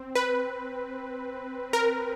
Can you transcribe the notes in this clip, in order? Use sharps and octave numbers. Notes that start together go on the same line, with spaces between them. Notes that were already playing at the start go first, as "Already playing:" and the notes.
Already playing: C4
B4
A#4